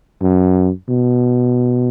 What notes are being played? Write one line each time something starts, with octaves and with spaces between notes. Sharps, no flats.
F#2
B2